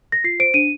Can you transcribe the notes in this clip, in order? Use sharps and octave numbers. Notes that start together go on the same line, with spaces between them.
A#6
F4 C7
C5 D7
D4 D#7